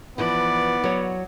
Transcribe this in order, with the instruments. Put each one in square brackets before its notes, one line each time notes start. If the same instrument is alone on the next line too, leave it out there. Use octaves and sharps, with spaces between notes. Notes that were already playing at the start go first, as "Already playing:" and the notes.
[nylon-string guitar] E3 F3 [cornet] B3 [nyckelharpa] D5
[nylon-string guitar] F#3 C#5